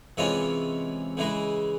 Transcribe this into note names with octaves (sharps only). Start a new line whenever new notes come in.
C3 E3 G#3 C#4 F4
C#3 E3 G#3